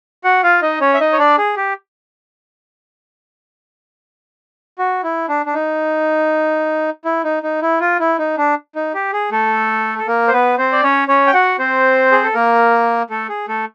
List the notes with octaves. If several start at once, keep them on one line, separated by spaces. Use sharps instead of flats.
F#4 F#5
F4 F5
D#4 D#5
C#4 C#5
E5
D#4 D#5
C#5
D4 D5
G#4
G4
F#4
E4
D4
D4
D#4
E4
D#4
D#4
E4
F4
E4
D#4
D4
D#4
G4
G#4
A3 A4
A4
A#3 A#4
C5
B3 B4
C4 C5
D5
C#4 C#5
C#4 C#5
G5
F#4 F#5
C4 C5
G#4
A4
A#3 A#4
A3 A4
G#4
A3 A4